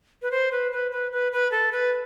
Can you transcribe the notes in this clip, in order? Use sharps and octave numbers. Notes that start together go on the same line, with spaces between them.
B4
C5
B4
B4
B4
B4
B4
A4
B4